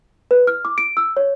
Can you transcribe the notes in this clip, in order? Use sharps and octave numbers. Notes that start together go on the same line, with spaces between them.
B4
F6
D6
D7
E6
C#5